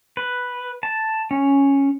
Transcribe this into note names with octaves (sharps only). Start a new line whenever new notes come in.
B4
A5
C#4